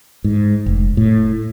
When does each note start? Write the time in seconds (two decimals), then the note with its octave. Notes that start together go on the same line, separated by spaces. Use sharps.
0.24 G#2
0.66 F1
0.97 A2